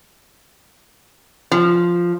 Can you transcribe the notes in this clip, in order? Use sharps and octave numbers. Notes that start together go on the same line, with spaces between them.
F3